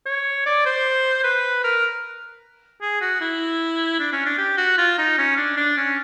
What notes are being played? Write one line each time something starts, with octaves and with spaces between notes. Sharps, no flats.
C#5
D5
C5
B4
A#4
G#4
F#4
E4
D4
C#4
D4
G4
F#4
F4
D#4
C#4
D4
D4
C#4